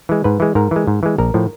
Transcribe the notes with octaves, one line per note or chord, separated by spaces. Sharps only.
E3 G#3
G#2 B4
E3 G#3
G#2 A#4
E3 G#3
G#2
E3 G#3
A#1 A#4
A2 F3